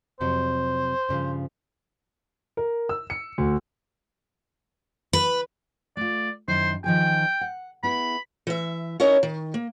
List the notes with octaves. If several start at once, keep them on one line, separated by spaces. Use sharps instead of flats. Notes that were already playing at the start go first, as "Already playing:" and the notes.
F2 C3 F#3 C5
G2 C#3 F3
A#4
E6
C#7
D2
B4
A3 F4 D5
F#2 D#3 E4 C5
D#3 F3 G#4 G5
F#5
B3 E4 G#4 B5
E3 E5
C#4 D#4 E4 A#4 C#5 D#5
D#3
A#3